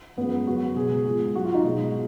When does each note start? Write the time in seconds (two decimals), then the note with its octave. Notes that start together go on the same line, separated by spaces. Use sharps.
0.17 F#2 F3 G#3 B3
0.47 F#2 C#3 F#3 F#4
0.76 B2 G#3 G#4
1.05 G#2 F3 G#3
1.35 G#2 F#3 F#4
1.45 F4
1.54 D#4
1.65 B2 G#3